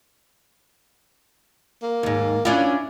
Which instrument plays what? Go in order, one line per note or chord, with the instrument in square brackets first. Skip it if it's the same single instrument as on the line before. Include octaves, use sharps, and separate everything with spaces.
[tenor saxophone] A#3
[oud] D#2 G#2
[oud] C#4 D4 F4 [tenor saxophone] E4